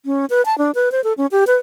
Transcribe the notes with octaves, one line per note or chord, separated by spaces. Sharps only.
C#4
B4
A5
D4
B4
C5
A4
C#4
G4
B4